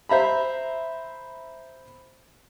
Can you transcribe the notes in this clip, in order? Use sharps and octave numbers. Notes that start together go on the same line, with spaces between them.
C5 E5 A#5 B5